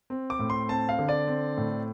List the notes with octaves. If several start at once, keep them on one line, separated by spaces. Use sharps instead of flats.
C4
D6
A2
C6
C4 A5
F5
D3
D5
C4
A2